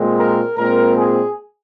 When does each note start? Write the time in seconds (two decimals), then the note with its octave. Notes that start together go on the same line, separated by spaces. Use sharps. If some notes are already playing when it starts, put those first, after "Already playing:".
Already playing: A#2 G#3 C4
0.17 A#4
0.57 A#2 G#3 C4 A#4
0.96 G#4